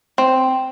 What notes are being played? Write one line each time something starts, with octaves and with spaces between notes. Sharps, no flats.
C4